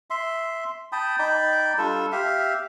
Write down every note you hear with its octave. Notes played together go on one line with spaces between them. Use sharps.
E5 C6
G5 A5 B5 D#6
D#4 D5 G5 B5
G3 D4 F4 A4
G4 E5 F5